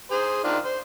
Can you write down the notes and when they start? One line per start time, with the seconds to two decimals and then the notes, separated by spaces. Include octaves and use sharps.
0.11 G#4 C5
0.44 D#3 D4 F4
0.64 C5